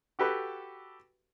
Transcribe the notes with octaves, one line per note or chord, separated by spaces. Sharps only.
F#4 G4 A4 B4